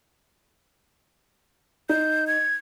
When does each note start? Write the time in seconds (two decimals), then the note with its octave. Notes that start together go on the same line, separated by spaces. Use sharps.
1.89 D#4 G6
2.27 G#6